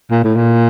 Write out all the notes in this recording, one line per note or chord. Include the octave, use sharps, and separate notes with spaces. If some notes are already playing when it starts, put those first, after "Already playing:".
A#2
A2
A#2